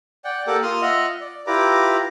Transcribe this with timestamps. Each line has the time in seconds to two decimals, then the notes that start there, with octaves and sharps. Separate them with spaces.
0.25 D5 F#5 G5
0.47 A#3 G4 A4 A#4 F#5 D6
0.63 A#3 F4 C6 D#6 F6
0.82 F4 D#5 E5 F#5 F6
1.21 D5
1.47 E4 F4 G4 B4 A#5 D6